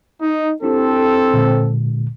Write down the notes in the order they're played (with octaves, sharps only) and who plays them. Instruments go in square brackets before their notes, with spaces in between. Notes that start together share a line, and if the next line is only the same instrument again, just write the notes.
[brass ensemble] D#4
[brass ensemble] C4 A4 [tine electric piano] D4 E4 G4
[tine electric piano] A#2 D3 G#3